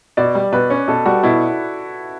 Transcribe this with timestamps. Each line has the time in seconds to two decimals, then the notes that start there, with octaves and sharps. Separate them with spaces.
0.17 B2 D5
0.35 G3
0.52 B2 B4
0.70 C#4
0.88 B2 A4
1.05 G3 F#4
1.23 B2 E4